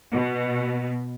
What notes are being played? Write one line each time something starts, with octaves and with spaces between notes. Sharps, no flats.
B2